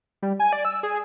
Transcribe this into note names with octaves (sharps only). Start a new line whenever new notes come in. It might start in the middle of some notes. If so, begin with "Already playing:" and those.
G3
G#5
D5
E6
G#4